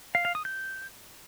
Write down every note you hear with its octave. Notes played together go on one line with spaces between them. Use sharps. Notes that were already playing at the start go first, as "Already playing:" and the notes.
F5
F5
D#6
G6